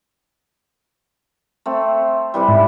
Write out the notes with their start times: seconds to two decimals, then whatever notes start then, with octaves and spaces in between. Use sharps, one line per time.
1.66 A3 C4
2.34 C3 E3 G3
2.49 G#2